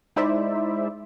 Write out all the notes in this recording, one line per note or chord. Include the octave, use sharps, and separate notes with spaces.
G#3 D#4 E4 C5 D5 E5